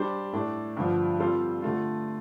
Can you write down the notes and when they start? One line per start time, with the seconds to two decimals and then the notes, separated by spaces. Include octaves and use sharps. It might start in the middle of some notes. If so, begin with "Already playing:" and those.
Already playing: G3 D4 G4 C5
0.33 A2 A3 D4
0.77 G2 D3 F3
1.20 G3 C4 F4 A4 C5
1.62 D3 A3 F4